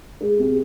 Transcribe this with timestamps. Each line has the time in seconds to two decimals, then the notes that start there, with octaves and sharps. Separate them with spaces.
0.21 G#3
0.39 C3